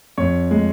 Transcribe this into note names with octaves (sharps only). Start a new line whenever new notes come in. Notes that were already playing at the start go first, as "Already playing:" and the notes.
F2 C#5
G#3